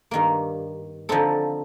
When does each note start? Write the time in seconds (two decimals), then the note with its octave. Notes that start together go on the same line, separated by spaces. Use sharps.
0.11 G2 D#3 A#3
1.09 D3 F3 C4 D#4 A4